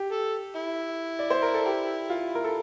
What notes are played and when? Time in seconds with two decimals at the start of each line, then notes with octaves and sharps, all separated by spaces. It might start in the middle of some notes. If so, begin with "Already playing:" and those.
Already playing: G4
0.11 A4
0.56 E4
1.19 D5
1.30 C5
1.42 A#4
1.54 A4
1.66 G4
2.10 F4
2.35 A#4
2.44 A4